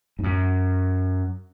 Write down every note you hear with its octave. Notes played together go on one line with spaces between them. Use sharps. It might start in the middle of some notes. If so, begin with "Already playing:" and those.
G#2
F#2